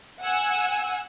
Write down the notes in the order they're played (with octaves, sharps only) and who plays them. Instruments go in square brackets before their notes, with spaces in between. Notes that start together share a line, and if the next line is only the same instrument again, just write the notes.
[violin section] F#5 G#5 E6